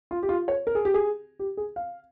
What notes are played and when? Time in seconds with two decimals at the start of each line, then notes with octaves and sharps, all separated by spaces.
0.11 F4
0.23 G4
0.29 F4
0.48 C#5
0.67 A#4
0.75 G#4
0.85 G4
0.94 G#4
1.39 G4
1.57 G#4
1.76 F5